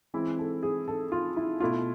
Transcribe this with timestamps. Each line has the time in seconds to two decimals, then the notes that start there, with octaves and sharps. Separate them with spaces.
0.14 E3 G#3 C4 E4
0.39 A4
0.63 G#4
0.88 A4
1.12 F4
1.37 E4
1.60 B2 A3 E4 F4